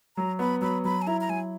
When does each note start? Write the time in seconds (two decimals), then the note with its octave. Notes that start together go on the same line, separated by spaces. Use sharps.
0.17 F#3 A#5
0.39 B3 B5
0.62 F#3 B5
0.85 F#3 B5
1.02 G#5
1.07 E4 A#5
1.21 A#5
1.29 F#3 G#5